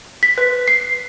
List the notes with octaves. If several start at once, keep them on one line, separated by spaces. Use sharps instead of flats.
B6
B4
C7